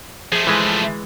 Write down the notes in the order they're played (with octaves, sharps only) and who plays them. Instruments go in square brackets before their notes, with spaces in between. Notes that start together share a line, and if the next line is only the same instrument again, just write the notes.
[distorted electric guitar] F3 A3 [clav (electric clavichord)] G#4
[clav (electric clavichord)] E3 G#3 B4